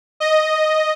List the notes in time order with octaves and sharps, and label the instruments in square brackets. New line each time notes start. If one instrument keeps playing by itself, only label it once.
[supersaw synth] D#5